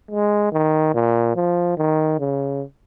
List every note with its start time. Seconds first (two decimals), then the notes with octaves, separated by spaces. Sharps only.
0.11 G#3
0.52 D#3
0.94 A#2
1.36 F3
1.78 D#3
2.19 C#3